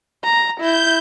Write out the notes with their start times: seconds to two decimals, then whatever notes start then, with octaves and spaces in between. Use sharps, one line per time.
0.24 A#5
0.60 E4 G6